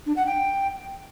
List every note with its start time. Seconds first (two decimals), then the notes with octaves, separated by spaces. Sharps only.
0.06 D4
0.16 F#5
0.26 G5